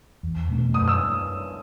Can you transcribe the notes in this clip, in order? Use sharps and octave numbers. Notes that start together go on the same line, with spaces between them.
E2
B2 A3 C#4
F#2 D#6
E6